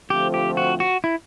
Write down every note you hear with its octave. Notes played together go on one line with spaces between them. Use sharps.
D3 F3 A3 C4 F4 G4
G4
F#4
F#4
E4